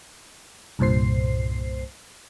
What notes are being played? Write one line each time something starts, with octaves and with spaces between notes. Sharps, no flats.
C2 G2 A#2 C5 C7